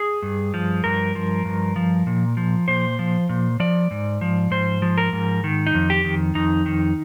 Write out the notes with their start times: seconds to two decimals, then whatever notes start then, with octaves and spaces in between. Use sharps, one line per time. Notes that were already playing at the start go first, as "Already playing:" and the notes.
Already playing: G#4
0.22 G2
0.54 F3
0.84 G2 A#4
1.15 F3
1.45 G2
1.76 F3
2.07 A#2
2.37 F3
2.68 A#2 C5
2.99 F3
3.29 A#2
3.60 F3 D5
3.91 G#2
4.21 F3
4.51 G#2 C5
4.82 F3
4.98 A#4
5.13 G#2
5.44 D#3
5.67 D#4
5.74 F2
5.90 G4
6.04 D#3
6.35 F2 D#4
6.66 D#3